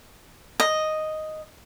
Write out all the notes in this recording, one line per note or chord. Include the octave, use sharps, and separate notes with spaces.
D#5